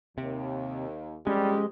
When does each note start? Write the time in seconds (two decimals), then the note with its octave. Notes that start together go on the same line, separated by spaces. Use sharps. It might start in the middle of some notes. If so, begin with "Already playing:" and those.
0.18 D#2 C3
1.27 F2 A#2 G3 G#3 C#4 G4